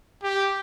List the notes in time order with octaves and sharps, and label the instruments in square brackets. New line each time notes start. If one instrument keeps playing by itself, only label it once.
[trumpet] G4